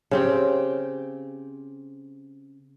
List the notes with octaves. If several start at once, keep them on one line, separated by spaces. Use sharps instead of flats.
C#3 C4 G4